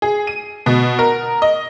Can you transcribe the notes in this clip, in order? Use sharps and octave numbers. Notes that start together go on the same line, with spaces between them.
G#4
D#7
B2
A#4
D#5